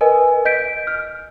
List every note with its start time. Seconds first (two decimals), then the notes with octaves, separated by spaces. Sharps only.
0.01 A#4 B4 D#5 G#5
0.45 D#5 G6 B6 D7
0.87 F6